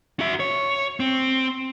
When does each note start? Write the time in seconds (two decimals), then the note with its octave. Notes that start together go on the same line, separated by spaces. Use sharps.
0.20 F#4 E5
0.40 C#5
1.00 C4